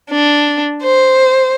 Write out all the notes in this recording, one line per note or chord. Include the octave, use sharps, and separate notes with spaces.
D4
C5